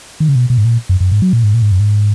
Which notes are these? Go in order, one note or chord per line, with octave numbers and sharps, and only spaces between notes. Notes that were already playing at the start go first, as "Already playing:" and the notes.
D#3
C#3
B2
B2
G#2
A#2
F#2
F#2
G#2
F#3
A#2
G#2
A#2
G#2
F#2
G#2